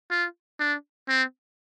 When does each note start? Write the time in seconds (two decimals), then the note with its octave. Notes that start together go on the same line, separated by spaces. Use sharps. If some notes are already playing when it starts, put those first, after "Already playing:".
0.11 F4
0.60 D4
1.08 C4